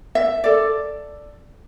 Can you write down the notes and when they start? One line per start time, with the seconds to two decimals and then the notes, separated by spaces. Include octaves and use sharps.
0.15 E5
0.44 A4 D5